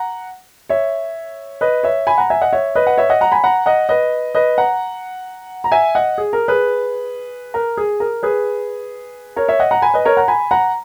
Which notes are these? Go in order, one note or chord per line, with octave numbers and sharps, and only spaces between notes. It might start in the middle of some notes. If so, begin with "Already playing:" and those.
Already playing: F#5 A#5
C#5 E5
B4 D#5
C#5 E5
G#5 B5
F#5 A#5
E5 G#5
D#5 F#5
C#5 E5
B4 D#5
F#5
C#5 E5
D#5 F#5
F#5 A#5
G#5 B5
F#5 A#5
D#5 F#5
B4 D#5
B4 D#5
F#5 A#5
A#5
E5 G#5
D#5 F#5
G#4
A#4
G#4 B4
A#4
G#4
A#4
G#4 B4
A#4 C#5
C#5 E5
D#5 F#5
F#5 A#5
G#5 B5
B4 D#5
A#4 C#5
F#5 A#5
G#5 B5
F#5 A#5